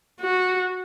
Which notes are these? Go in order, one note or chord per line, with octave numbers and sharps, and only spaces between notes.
F#4